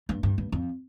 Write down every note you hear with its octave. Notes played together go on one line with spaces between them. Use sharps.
G2
G2
G2
F2